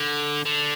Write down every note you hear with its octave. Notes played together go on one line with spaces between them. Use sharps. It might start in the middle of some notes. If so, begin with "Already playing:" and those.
Already playing: D3
D3